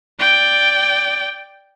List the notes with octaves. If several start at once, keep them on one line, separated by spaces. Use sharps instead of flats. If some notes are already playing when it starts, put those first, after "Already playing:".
D5 G5